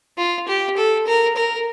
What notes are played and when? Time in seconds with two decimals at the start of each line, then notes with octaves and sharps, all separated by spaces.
0.17 F4
0.48 G4
0.76 A4
1.06 A#4
1.36 A#4